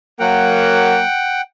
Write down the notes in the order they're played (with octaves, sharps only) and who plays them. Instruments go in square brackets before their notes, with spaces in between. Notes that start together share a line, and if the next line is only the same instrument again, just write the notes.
[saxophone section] F#3 A#3 [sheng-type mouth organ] F#5 G5